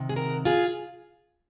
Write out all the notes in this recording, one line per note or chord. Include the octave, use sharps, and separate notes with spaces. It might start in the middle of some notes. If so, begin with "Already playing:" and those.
Already playing: C3 D#3
G#4
F#4 A#4
F4 G#4